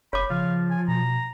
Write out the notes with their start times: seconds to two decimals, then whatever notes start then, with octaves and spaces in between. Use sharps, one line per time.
0.13 F#1 C#5 B5 D6
0.30 C#3 F3 F5
0.70 G#5
0.88 B2 A#5